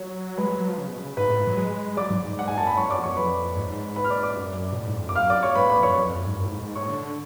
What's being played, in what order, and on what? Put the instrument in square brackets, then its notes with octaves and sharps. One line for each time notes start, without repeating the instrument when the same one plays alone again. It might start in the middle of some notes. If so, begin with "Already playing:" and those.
Already playing: [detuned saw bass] F#3 [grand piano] C#5
[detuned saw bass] G#3 [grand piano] B4 B5
[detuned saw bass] F#3
F#3
F3
C#3
B2
C#3
[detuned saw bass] G#2 [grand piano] B4 B5
[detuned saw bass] A2
G#2
F#3
G#3
[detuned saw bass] F#3 [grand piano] D5 D6
[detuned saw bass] G#2
G#2
[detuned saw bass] G#2 [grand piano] F#5
[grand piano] G#5
[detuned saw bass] F#2 [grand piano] A5
[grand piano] B5
[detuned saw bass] G#2 [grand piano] C#5 C#6
[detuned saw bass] F#2 [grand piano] D5 D6
[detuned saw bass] F2
[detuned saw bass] F#2 [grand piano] C#5 C#6
[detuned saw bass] F2 [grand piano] B4 B5
[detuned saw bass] G#2
[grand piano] B4 B5
F6
D5 D6
D5 D6
[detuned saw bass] F#2
B2
A2
G#2
F2
[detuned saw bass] F#2 [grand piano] D6
[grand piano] F5 F6
D5 D6
C#5 C#6
[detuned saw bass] G#2 [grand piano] B4 B5
[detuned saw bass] A2 [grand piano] B4 B5
[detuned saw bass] F2
[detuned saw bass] F#2 [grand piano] C#5 C#6
[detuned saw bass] F2
F2
F#2
G#2
F#2
A2
G#2
G#2
[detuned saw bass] A2 [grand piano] C#5 C#6
[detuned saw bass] D3
D3